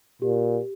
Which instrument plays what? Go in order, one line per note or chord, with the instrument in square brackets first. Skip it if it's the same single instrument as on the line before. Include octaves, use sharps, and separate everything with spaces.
[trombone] A#2 [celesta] G4